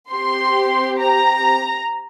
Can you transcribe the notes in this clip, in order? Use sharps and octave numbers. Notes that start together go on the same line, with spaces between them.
C4 G4 C6
A#5